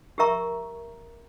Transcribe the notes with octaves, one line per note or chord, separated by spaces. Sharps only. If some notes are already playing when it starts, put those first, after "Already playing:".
G4 A#4 E5 A#5 C#6